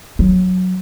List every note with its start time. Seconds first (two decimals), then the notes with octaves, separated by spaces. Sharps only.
0.19 F#3